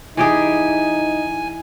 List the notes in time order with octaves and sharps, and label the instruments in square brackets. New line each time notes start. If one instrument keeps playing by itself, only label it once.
[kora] E3 G4 G#4 [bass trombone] D#4 [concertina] G#5